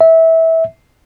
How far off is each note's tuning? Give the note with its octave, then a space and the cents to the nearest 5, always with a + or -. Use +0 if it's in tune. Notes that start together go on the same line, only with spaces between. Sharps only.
E5 -20